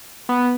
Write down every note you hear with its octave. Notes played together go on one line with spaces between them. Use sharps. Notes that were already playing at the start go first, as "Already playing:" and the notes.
B3